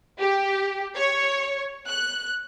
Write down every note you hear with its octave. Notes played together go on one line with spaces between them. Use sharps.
G4
C#5
F#6